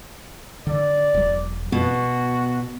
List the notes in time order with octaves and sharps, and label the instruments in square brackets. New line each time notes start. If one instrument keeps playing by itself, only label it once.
[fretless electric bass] D3 [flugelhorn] D5
[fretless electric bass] E1 F#3
[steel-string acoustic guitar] B2 [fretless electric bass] B3 [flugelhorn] F#4